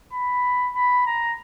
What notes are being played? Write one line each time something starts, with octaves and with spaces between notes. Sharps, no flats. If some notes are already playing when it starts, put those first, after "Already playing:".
B5
B5
A#5